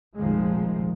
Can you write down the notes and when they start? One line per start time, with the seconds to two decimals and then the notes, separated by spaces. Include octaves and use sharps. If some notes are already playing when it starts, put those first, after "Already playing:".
0.16 F1 A#1 D#3 F3 G#3